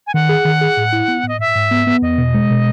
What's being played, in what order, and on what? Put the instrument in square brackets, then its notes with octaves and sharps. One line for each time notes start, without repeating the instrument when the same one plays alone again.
[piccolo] G#5
[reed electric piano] D#3 [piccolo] F#5
[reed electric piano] G#4
D#3
G#4
A2
E4
B3
[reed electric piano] A2 [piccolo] D#5
[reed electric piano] G#2 [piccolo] E5
[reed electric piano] G#2
B3
B3
[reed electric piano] E2 [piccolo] D#5
[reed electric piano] B2
G#3
B2